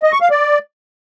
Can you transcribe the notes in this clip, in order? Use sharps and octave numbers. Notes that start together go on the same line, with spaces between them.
D#5
C#6
F5
D5